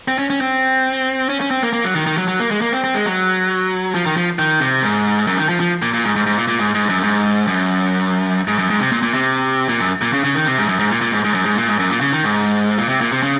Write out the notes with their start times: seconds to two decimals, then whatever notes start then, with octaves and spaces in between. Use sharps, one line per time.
0.08 C4
0.19 C#4
0.30 C#4
0.41 C4
1.29 C#4
1.41 C#4
1.51 C4
1.62 A#3
1.73 A#3
1.84 F#3
1.95 D#3
2.07 D#3
2.18 F#3
2.28 F#3
2.40 A#3
2.51 G#3
2.61 A#3
2.72 C4
2.84 C4
2.94 G#3
3.06 F#3
3.95 F3
4.06 D#3
4.17 F3
4.39 D#3
4.60 C3
4.82 G#2
5.27 F#2
5.38 D#3
5.49 F3
5.60 F3
5.82 A#2
5.93 A#2
6.04 G#2
6.16 G#2
6.26 G#2
6.37 A#2
6.48 A#2
6.59 G#2
6.74 G#2
6.89 F#2
7.03 G#2
7.47 F#2
8.48 G#2
8.59 F#2
8.70 G#2
8.80 C3
8.92 A#2
9.03 A#2
9.14 C3
9.69 A#2
9.80 F#2
10.01 A#2
10.13 C#3
10.24 C#3
10.35 D#3
10.46 C3
10.58 G#2
10.69 F#2
10.79 G#2
10.90 A#2
11.01 A#2
11.12 G#2
11.24 G#2
11.34 F#2
11.45 G#2
11.57 A#2
11.67 G#2
11.79 F#2
11.90 A#2
12.01 C#3
12.13 D#3
12.24 G#2
12.78 A#2
12.89 C3
13.01 A#2
13.12 C3
13.23 C#3